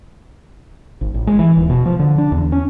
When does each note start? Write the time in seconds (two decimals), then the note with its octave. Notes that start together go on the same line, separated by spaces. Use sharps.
1.01 G#1
1.14 A1
1.27 G#3
1.39 E3
1.57 D#1
1.70 B2
1.86 F3
1.99 D3
2.18 D4
2.32 E2
2.52 C#4